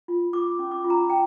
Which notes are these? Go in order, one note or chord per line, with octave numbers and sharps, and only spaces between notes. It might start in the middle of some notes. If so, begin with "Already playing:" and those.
F4
F4 D6
C#4
D6
F4
A#5
C#4 G5